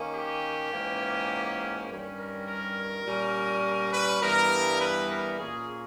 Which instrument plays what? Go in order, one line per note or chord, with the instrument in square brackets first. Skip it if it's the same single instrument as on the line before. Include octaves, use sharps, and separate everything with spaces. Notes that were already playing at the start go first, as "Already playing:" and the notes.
Already playing: [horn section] D#3 A#3 C#4
G4
G#2 E3 A#3 C#4
G2 D#3 G3 C#4
A#4
A#4
A#2 G3 C#4
A#4
B4
G2 E3 G3 B3 A#4
B4
A#4
A#2 A#3 C#4 G#4